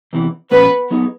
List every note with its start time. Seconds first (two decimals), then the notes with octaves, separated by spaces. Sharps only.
0.13 E2 C3 E3
0.51 A#2 F3 A3 B3 C#4 F#4 B4
0.91 F#3 B3 D#4 G#4